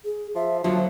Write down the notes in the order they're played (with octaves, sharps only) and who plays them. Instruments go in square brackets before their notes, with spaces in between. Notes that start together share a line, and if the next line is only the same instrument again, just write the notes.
[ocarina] G#4
[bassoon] F3 [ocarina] E5
[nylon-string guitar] D#2 D3 F#3 [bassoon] F3 [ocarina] C5